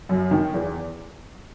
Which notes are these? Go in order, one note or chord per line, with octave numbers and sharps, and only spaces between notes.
F#2
D#3
E2